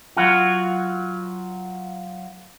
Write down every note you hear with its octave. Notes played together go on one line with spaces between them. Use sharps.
F#3 F4 F#4